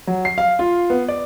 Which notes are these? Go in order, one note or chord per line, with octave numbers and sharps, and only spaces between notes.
F#3
C7
F5
F4
B3
D5